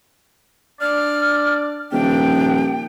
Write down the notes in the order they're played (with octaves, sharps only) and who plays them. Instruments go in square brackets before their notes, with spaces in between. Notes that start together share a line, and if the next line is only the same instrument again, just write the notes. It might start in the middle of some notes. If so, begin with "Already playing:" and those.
[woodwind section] D4 D5 [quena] F6
[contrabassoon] D#1 [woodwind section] D#3 F3 D4 [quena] G5